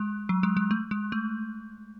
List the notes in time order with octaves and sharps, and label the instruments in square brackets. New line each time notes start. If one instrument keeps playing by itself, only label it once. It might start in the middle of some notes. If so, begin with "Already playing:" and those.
Already playing: [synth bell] G#3
F#3
G#3
G#3
A3
G#3
A3